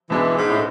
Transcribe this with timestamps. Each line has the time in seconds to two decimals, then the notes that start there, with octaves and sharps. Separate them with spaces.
0.10 C#2 B2 E3 G#3 D4
0.36 G#2
0.49 A2